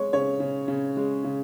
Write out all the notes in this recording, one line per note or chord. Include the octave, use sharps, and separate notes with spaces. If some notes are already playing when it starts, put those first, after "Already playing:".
Already playing: G#3 C#5
C#3 C#5
C#3
C#3
G#3
C#3